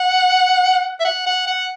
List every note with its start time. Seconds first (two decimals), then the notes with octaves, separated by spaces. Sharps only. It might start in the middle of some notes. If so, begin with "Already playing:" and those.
Already playing: F#5
1.00 E5
1.05 F#5
1.26 F#5
1.47 F#5